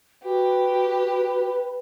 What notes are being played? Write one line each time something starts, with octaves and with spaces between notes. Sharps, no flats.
F#4 G4 B4